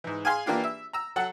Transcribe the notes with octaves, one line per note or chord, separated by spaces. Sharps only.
G#2 E3
G#4 F5 G#5 C6
E3 A#3 D4 F4 G4
E5
A#5 E6
F#3 A4 F#5